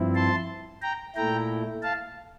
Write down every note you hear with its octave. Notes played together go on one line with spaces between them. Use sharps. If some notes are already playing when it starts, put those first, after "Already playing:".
Already playing: G2 F3 C4 E4
A5 C6
G5 A#5
A#2 A3 E4 G5 A#5
F5 A5